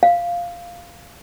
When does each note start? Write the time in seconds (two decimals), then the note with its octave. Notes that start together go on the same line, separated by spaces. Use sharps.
0.03 F5